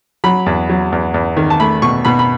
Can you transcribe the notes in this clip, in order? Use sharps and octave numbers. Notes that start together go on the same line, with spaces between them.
F#3 B5
E2
F#3
E2
E2
D#3
A5
A3 B5
B2 C#6
B2 B5
B5